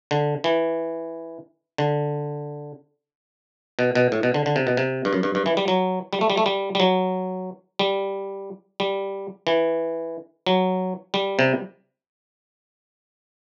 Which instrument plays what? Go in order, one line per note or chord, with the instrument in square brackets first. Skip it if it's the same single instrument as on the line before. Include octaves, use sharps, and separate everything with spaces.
[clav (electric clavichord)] D3
E3
D3
B2
B2
A2
B2
D3
D3
C3
B2
C3
G2
F#2
G2
G2
E3
G3
F#3
G3
A3
G3
A3
G3
G3
F#3
G3
G3
E3
F#3
G3
C3